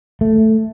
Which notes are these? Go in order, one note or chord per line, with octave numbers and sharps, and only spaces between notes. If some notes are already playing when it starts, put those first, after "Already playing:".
A3